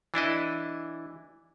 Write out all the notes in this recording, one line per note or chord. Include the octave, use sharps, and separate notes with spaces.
E3 D4 E4 D#5